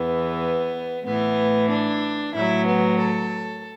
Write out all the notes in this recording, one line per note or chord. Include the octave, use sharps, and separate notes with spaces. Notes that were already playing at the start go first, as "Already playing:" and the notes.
Already playing: E2 E3 B3
A2 E3 B3
D4
A2 F#3 E4
B3
A4